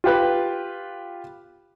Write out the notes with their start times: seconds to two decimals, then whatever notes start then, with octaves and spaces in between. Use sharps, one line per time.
0.04 F4 G4 B4